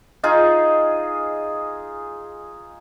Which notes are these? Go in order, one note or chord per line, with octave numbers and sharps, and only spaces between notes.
D#4 F4 G#4